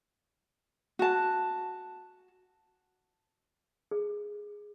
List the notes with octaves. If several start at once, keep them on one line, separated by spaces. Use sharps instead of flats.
F#4 A5
G#4